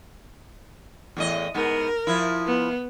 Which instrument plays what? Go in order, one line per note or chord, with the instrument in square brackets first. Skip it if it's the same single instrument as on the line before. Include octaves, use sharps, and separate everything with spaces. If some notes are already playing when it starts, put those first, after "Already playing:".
[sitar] E2 A2 D#5
[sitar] G#2 B3 [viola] A#4
[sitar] F3 E4
[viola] B3